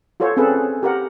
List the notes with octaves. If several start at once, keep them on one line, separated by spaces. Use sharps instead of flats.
F4 F#4 A4 C5 C#5
C4 C#4 G#4 A4 B4
G4 A#4 F#5